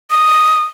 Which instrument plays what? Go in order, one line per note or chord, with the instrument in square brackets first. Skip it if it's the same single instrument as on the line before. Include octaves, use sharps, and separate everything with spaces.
[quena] D#6